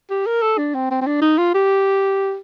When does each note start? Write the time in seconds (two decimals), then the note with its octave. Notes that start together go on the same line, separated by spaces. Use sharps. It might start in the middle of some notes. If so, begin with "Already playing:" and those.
0.10 G4
0.26 A#4
0.42 A4
0.58 D4
0.74 C4
0.91 C4
1.01 C4
1.07 D4
1.22 D#4
1.38 F4
1.54 G4